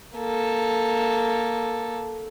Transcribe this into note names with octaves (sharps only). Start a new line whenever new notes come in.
A#3 A4